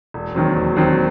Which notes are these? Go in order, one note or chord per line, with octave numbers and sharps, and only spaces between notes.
E1
D#2 D#3 F#3 C4
E1
D#2 D#3 F#3 C4